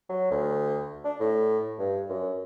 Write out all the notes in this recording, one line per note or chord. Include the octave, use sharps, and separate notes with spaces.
F#3
D2
D4
A2
G2
F#2